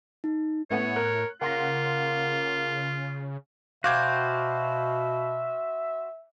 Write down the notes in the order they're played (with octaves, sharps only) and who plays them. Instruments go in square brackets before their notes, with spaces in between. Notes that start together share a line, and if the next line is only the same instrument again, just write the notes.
[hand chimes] D#4
[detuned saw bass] A2 [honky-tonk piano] A3 B3 F#5 [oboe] C#5
[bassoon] A#4 [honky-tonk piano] F#6
[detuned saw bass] C#3 [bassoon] A#3 [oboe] F4 [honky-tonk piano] F#5 C6 A#6
[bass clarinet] B2 [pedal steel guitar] F#4 C5 G5 [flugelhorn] E5 [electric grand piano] F5 D6 G#6